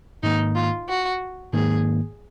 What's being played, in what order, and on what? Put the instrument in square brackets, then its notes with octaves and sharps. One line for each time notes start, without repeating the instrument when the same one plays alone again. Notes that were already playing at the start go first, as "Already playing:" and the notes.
[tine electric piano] G#2 D#3 A#3 [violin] D#4
[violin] F4
F#4
[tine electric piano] G#2 D#3 A#3 [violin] G#4